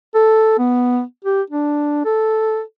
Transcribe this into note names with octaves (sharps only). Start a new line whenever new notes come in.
A4
B3
G4
D4
A4